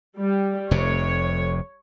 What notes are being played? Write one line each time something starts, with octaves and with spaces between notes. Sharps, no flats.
G3
F1 F2 C3 C#5